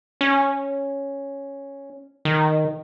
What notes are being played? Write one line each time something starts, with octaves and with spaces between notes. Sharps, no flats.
C#4
D#3